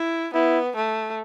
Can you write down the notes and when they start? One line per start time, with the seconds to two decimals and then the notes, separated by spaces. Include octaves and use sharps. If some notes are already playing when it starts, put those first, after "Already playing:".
Already playing: E4
0.34 B3 E4
0.76 A3